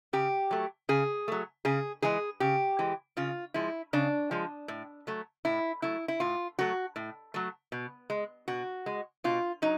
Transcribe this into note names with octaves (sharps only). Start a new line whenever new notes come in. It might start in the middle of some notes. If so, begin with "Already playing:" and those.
C#3 G4
F#3 A3
C#3 G#4
F#3 A3
C#3 G#4
E3 G#3 G#4
C#3 G4
E3 G#3
C#3 F4
F3 G#3 E4
C#3 D4
F3 G#3
A2
F#3 A3
A2 E4
F#3 A3 E4
E4
A2 F4
F#3 A3 F#4
A2
F#3 A3
B2
G#3
B2 F#4
G#3
B2 F4
F#3 D#4